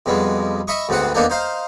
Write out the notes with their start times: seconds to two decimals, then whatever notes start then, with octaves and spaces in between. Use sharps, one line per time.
0.06 F2 B2 G3 G#3
0.68 D#5 E5 B5 C#6 D#6
0.89 D2 G#2 B3 C4 F#5
1.15 D#2 A#3 B3 D4 D#4 A4
1.30 D#4 C5 F5